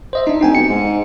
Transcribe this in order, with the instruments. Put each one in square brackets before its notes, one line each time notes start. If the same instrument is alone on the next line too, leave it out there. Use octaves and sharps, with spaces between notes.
[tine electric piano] C5 D#5 E5
D4 D#4
[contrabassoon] F1 [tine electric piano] D#4 G5 G#5
[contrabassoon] B1 [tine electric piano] C#7
[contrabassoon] G#2